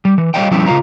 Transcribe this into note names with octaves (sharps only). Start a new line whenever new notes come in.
G3
E3
G3 A3 C#5 D#5 F5 G5
F3 G3 C#4 E4 G5
C#3 F4 C#5 F5 A#5